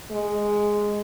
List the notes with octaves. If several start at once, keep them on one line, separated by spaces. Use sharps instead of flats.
G#3